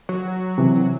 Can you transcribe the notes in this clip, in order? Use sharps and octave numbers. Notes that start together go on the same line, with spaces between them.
F#3
C3 E3